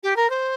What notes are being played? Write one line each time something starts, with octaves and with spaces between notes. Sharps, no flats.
G4
A#4
C5